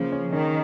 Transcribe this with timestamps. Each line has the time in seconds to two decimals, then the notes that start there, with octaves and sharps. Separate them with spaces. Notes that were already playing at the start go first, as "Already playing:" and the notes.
Already playing: C#3 F3 A#3
0.12 C#4
0.32 D#3 C#4